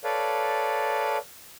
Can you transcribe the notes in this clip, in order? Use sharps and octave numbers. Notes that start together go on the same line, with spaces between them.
A4 B4 C#5 D5 F5